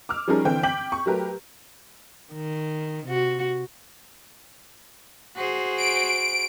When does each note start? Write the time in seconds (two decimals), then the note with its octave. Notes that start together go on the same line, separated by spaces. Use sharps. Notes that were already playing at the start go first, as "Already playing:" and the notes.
0.09 D6 E6 F6
0.28 F3 G3 C#4 D#4 G#4 A#4
0.45 D3 E3 C4 G5
0.63 G5 D6 G6 B6 F#7
0.92 C#6
1.06 F#3 A3 G4 A#4 B4
2.34 D#3
3.06 C3 F#4
5.36 F#4 G#4 C5
5.78 D7